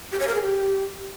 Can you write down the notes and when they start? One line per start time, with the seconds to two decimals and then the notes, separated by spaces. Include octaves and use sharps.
0.12 G4
0.20 C#5
0.27 A#4
0.35 G#4
0.42 G4